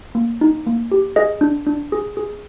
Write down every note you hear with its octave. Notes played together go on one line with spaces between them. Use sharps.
A#3
D#4
A#3
G4
G#4 D#5
D4
D4
G#4
G#4